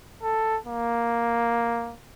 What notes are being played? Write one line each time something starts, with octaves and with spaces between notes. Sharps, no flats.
A4
A#3